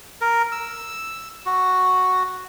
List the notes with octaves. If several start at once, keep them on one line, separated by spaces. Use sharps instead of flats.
A#4
E6
F#4